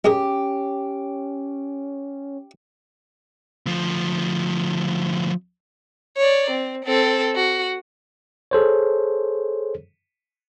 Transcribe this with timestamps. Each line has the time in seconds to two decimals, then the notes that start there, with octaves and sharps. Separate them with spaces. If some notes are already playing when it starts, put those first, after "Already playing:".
0.05 G#3 C#4 G4 G#4 A#4
3.66 D2 F3
6.17 C#5 D5
6.50 C4
6.85 C4 A4
7.35 F#4
8.51 G#4 A4 C5 C#5